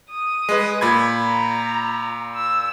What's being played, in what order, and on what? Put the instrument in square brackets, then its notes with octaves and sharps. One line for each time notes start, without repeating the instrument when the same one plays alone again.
[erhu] D#6
[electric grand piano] G#3 B4
A#2 B5 G#6
[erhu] A#5
E6